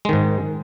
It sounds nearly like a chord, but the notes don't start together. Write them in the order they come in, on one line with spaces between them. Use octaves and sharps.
G#3 D#3 G#2